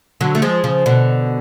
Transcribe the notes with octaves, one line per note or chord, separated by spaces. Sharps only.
D3 F#3
A3
F3 G#3
C#3 F3
B2 D3